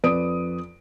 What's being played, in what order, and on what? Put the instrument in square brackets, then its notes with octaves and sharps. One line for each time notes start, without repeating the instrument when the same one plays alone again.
[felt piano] F2 B4 D5 D#6 D7